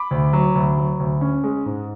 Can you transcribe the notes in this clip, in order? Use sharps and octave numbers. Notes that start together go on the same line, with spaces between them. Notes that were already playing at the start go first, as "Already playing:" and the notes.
Already playing: B5 D6
D2
F#3
D2
F#3
D2
C#4
G#3
G#2